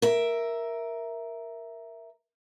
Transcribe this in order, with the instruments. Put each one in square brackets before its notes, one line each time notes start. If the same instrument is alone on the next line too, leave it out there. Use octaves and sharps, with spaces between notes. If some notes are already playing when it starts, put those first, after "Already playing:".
[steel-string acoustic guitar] A#4 E5